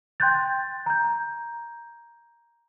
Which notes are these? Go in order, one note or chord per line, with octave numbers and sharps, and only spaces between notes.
G5 C6 F#6 G6 A6
A#5 G6